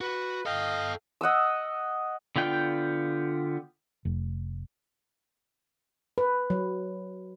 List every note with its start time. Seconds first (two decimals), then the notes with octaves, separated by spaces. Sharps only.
0.01 F#4 B4
0.45 A4 D#5 F5 G5
1.21 D#5 F#5 D#6 E6
2.36 D3 B3 F4 G5 G6
4.05 F1
6.18 B4
6.50 F#3